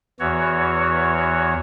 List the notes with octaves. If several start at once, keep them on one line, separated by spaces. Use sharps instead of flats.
E2 E3 F#4 C#5